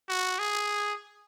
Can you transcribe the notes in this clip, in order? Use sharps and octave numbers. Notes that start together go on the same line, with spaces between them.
F#4
G#4